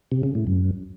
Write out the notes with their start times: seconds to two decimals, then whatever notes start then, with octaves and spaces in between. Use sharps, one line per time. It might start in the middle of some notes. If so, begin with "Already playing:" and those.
0.12 C3
0.23 C#3
0.35 A2
0.47 F#2